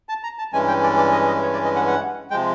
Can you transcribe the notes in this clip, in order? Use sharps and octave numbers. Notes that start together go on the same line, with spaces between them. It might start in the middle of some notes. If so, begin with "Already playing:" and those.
A5
A#5
A5
G2 E3 G#3 C#4 G#5
G5
D5
D5
D#5
D#5
C#5
D5
D#5
F#5
F#5
C3 F3 G#3 G5